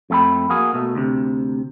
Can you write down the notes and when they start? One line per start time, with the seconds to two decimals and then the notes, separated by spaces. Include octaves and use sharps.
0.10 F2 A3 A4 G5 B5
0.50 A#3 F#4 G#4
0.73 B2 A3
0.95 D2 C3